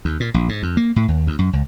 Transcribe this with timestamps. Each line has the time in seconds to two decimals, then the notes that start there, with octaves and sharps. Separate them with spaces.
0.05 D#2
0.20 A#2
0.34 A#1
0.49 G#2
0.63 F2
0.77 A#3
0.96 A2
1.08 D#2
1.27 D2
1.39 F#2
1.53 C#2